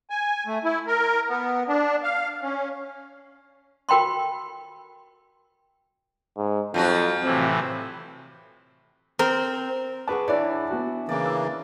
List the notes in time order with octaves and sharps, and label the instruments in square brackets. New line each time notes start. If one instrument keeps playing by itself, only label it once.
[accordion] G#5
A3
E4
A#4
B3
D4
F5
C#4
[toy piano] F#4 A#4 G5 B5 C6
[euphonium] G#2
[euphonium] F2 [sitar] F3 F#3 F#4
[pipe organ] A2 C3 E3 [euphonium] C4
[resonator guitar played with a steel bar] C4 [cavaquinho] A#4
[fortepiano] G#4 B4 A5 [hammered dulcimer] F#5 C#6 D6
[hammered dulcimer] E3 D4 [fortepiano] E4 C#5 D5
[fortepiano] B3 F#4
[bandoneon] C#3 E3 A#3 [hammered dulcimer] D5 C6 D6
[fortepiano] E6